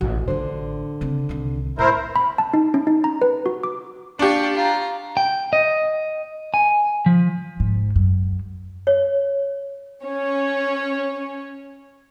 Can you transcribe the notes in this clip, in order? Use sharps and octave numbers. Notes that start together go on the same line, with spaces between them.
A1 F#4
A1 D3 D4 F4 C5
C#3 C4
C2 D#3
A2 E4 A#4 C5
B5
A5
D#4
C#4
D#4
A#5
B4
F#4
D6
D4 F4 G4 C#6
F4 A#5
G5
D#5
G#5
F3
G#2
F#2
C#5
C#4 C#5